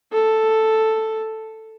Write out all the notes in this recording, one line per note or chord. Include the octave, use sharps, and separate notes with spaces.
A4